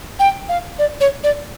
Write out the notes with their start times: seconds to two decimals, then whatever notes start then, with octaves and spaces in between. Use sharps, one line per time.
0.19 G5
0.49 F5
0.79 D5
1.00 C#5
1.24 D5